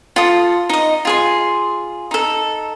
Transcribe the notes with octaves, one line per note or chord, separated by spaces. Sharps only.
F4 A4 D#6
D#4 D#5
F4 G#4 C6
D#4 A4